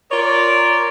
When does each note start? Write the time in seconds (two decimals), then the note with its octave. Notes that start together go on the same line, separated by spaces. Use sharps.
0.12 F4 A#4 C#5 D5